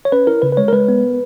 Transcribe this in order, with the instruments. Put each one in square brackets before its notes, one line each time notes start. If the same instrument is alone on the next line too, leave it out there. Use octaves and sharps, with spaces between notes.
[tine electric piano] C#5
C#4 B4
E4 A#4
C#3 B4
B4
G#3 C#5
A#4
G#3 B4
B3